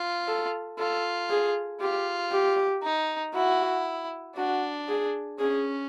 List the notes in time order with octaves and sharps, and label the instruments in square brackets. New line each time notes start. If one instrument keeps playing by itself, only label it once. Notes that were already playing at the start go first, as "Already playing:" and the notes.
Already playing: [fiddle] F4
[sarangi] A4
[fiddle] F4 [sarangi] A4
[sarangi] G#4
[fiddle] F4 [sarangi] G4
[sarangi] G4
[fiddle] D#4
[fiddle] E4 [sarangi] F#4
[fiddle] D4 [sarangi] F#4
[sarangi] G#4
[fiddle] C#4 [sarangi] G#4